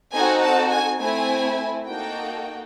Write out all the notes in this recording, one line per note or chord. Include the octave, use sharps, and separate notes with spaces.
C4 D#4 F#4 A4 G#5
A5
G#5
A3 C4 E4 G#5
A#3 D#4 F#4 A4 G5